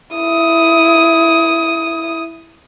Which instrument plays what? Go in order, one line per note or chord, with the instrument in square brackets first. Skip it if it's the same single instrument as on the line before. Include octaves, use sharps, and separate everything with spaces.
[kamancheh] E4 D#6